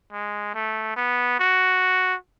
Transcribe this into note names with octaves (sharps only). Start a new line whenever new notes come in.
G#3
A3
B3
F#4